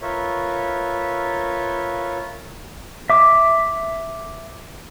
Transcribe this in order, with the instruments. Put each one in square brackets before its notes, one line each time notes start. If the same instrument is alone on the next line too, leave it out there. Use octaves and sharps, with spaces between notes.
[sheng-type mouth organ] F4 A#4 B4 C#5 E5
[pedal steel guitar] E5 D6